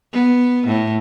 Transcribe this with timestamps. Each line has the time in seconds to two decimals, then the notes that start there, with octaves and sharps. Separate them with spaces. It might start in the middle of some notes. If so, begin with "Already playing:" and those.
0.13 B3
0.67 A2